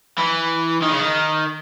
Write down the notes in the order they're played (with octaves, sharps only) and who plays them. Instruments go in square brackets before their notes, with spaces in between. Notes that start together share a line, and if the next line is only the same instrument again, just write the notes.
[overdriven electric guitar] E3
D#3
C#3
D#3